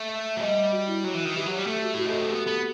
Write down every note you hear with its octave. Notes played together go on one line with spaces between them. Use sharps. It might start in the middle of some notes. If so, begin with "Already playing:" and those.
Already playing: A3
E5
F#3
G3 D#5
F#4
E4
F#3 F#4
E3
D#3
E3 G4
F#3
G3
A3 A4
F#4
E4
F#4
D#4 A4
C4 A4
B3 G4
B3 A4